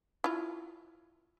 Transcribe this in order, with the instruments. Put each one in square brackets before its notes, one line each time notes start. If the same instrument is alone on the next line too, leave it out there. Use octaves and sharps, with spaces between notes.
[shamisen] E4 F4